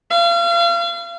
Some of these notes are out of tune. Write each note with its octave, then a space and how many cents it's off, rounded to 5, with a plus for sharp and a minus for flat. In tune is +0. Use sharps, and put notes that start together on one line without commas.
F5 -35